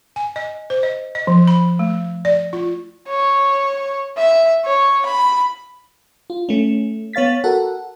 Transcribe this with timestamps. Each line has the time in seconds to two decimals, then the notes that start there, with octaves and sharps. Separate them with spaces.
0.16 G#5
0.36 D#5
0.70 C5
0.83 D#5
1.15 D#5
1.27 F3
1.48 B5
1.79 A3
2.25 D5
2.53 F4
3.08 C#5
4.18 E5
4.65 C#5
5.06 B5
6.30 F4
6.49 A3 C#4
7.13 B3 C#5 F5 A6 B6
7.44 F#4 A4 A#4 F#5